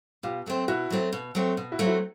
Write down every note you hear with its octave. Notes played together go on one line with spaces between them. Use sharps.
B2 F4 G4
F#3 A3 C4
B2 E4 F#4
F#3 A3 C4
B2
F#3 A3 C4
B2
E4 F#4
F#3 A3 C4
E4 F#4